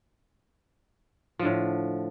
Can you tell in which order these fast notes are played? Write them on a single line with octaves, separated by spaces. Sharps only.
F3 D3 A2